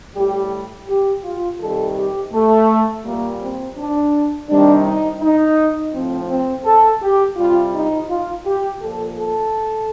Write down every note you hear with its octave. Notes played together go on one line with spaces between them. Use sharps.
A2 G3 G4
G4
F4
C3 D#3 G3 A4
G4
A3
A#2 G3 A#3
C4
D4
C3 D#3 G3 D4
D#4
D#4
A2 F3 C4
C4
A4
G4
C3 G3 F4
D#4
F4
G4
A#2 F3 A4
A4